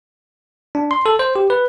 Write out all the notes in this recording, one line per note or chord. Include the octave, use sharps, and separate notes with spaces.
D4
C6
A4
C5
G4
B4